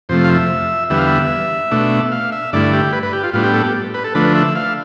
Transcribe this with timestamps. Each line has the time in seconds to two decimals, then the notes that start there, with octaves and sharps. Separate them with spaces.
0.09 F2 C3 F3 A3 C5
0.24 F5
0.29 E5
0.90 E2 D3 G3 B3 E5
0.98 F5
1.07 E5
1.71 B2 A3 D4
2.12 F5
2.32 E5
2.53 G2 D3 A3 E4 D5
2.73 G4
2.93 B4
3.03 B4
3.13 G4
3.23 F4
3.33 A2 G3 B3 D4 F4
3.44 G4
3.54 A4
3.64 G4
3.94 B4
4.04 A4
4.15 D3 F3 A3 D4 B4
4.35 E5
4.55 F5